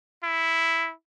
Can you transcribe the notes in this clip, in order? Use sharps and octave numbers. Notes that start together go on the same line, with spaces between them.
E4